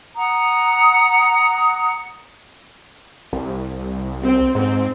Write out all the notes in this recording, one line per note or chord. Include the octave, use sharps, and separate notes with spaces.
F#5 A#5 D#6
C2
C4
G#2 C4